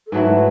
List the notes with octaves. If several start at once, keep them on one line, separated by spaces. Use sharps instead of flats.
A4
G#2 F#3 A3 E4 B4